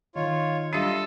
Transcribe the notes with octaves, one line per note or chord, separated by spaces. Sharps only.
D#3 F4 C#5
G3 D4 F4 A4 D#5 E5 D#7